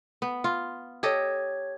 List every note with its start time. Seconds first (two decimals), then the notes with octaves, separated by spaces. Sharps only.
0.22 B3
0.44 F4
1.03 G4 A4 C#5 D#5 G#6